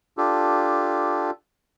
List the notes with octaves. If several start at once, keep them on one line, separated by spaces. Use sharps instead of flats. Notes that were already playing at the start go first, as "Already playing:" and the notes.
D4 F4 G4 A4